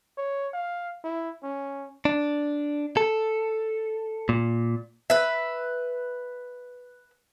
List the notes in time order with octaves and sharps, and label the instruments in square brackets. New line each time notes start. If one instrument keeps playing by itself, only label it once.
[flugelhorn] C#5
F5
E4
C#4
[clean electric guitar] D4
A4
A#2
[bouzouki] B4 E5